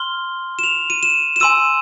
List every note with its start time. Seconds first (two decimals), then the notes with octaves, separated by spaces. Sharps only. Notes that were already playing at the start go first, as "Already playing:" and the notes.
Already playing: C6 F6 G7
0.59 E7
0.63 F7
0.90 D#7
1.03 E7
1.36 E7
1.40 G#5 C6 E6 D#7